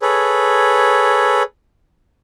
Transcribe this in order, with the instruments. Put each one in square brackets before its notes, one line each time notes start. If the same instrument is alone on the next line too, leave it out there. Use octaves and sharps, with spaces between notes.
[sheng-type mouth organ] G#4 A4 B4 C#5